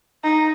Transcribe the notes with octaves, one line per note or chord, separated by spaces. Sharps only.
D#4